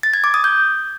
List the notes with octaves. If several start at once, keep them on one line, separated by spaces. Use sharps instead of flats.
A6
G#6
D6
D#6
G6